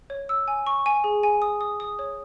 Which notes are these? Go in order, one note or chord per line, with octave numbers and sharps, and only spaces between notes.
C#5
E6
G#5
C#6
G#5
G#4
G#5
D#6
D#6
D#6
C#5